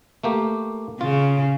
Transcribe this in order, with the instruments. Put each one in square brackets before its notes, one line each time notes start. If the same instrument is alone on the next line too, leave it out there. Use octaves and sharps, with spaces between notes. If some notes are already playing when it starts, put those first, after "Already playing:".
[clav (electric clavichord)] A3 A#3 G4
[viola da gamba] C#3 [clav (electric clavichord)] F4